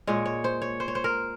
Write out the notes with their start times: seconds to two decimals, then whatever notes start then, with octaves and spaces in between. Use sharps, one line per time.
0.07 A#2 G#3 C#5
0.26 C#5
0.44 C5
0.62 C#5
0.80 C5
0.88 C#5
0.95 C5
1.04 A#4